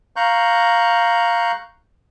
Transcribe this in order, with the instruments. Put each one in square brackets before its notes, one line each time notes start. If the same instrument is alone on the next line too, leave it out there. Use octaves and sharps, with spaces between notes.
[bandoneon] F5 A#5 C#6 F#6 G6